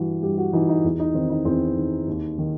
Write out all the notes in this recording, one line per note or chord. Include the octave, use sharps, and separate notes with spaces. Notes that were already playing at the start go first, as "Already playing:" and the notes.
Already playing: G2 E3 F#4
G2 G4
F#4
E3 D#4
D#4
E2
D#4
D#3 C4
D#4
E2 C4
D#3
D#2
D#3